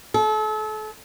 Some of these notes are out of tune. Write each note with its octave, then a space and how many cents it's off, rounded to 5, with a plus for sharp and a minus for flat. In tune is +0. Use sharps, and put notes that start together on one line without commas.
A4 -35